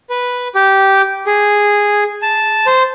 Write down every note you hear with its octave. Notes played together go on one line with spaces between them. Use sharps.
B4
G4
G#4
A5
C5